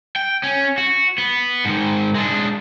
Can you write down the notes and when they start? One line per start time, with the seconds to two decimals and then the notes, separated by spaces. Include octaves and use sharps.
0.16 G5
0.43 C#4
0.78 F#4
1.18 B3
1.65 G#2 D#3
2.16 G#3 D4